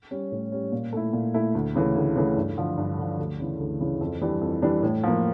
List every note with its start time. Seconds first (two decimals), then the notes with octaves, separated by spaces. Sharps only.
0.11 G3 C#4
0.32 A2
0.52 G3 C#4
0.72 A#2
0.93 A3 E4
1.13 A#2
1.34 A3 E4
1.55 D2
1.75 C#3 E3 A3
1.95 D2
2.15 C#3 E3 A3
2.37 G2
2.58 D3 F3
2.78 G2
2.98 D3 F3
3.19 D2
3.39 C#3 E3
3.60 D2
3.81 C#3 E3
4.01 F2
4.21 E3 G3 D4
4.41 F2
4.62 E3 G3 D4
4.83 A2
5.03 F3 A#3